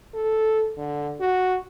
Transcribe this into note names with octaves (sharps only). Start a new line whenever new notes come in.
A4
D3
F#4